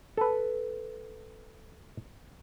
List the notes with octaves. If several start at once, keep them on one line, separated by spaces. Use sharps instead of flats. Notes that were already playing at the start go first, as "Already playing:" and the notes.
A4 B4